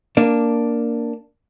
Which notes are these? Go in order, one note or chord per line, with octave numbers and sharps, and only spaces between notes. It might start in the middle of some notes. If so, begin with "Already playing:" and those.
A#3 D4